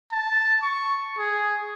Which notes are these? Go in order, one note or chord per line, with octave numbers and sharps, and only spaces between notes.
A5
C#6
G#4